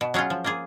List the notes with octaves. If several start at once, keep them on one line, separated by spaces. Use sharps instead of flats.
B2
F#3 C#4 F4 G#4
F3
A#3 F4 G#4